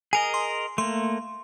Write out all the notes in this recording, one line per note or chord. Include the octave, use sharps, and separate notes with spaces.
G#4 A#4 D#5 G#5
C6
A3 A#3 C6